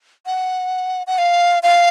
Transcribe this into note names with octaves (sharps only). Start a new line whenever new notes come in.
F#5
F#5
F5
F5